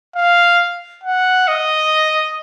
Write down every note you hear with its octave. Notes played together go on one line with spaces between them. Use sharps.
F5
F#5
D#5